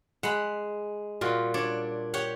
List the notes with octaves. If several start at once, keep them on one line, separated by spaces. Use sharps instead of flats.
G#3 F#5 B5
A#2 G3 F4 F#4
D4 C#5 D5
G4 C#5 F#5